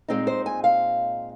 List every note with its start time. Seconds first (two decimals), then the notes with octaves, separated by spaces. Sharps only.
0.08 A#2 G#3 C4 D#4
0.27 C5
0.46 G#5
0.64 F5